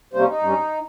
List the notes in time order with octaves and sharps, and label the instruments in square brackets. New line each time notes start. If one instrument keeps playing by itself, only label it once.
[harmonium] C3 G3 A#3 C#4 C5
D#4
G2 G3 C#4